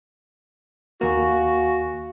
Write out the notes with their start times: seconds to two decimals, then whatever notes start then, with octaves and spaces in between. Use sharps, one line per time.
1.01 D#2 A#3 F#4 F5 G#5 C#6